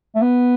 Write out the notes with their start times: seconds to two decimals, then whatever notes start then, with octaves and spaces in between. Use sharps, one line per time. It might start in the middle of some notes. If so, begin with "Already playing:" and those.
0.15 A3
0.22 B3